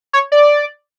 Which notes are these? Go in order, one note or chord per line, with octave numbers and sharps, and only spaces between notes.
C#5
D5